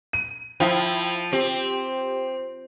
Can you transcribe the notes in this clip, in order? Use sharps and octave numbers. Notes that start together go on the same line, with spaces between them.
D#7
F3 E4 G5
C4 G4